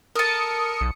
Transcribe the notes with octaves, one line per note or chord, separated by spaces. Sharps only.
A4 A#4 A5 D#6 C#7
B1